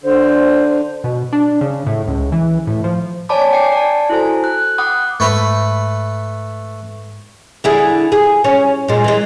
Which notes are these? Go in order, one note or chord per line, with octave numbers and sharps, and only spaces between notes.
D3 C5
B2
D4
C#3
A2
C#2
E3
A2
F3
C#5 D5 G#5 A5 B5 D6
G5 G#5 C7
D5 A5
E4 F#4 A4 C5 G#5
F#6
F#5 G5 B5 D6 D#6 F#6
G#2 A3 B4
D3 E4 G#4
G#4
C#4
A#2 G#3
E3 G#3